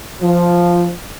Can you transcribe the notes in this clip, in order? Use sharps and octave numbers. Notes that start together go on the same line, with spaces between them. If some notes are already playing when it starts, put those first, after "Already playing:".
F3